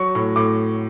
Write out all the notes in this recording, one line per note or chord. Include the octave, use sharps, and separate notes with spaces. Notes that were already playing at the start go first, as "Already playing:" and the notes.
Already playing: F#3 C#6
A2
A2 D6